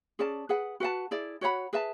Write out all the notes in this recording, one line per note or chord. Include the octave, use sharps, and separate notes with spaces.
C#4 G#4 D5 A5
G#4 B4 F#5
F#4 B4 F#5 A5
E4 G#4 D5
F#4 C#5 F#5 B5
G#4 B4 E5 A5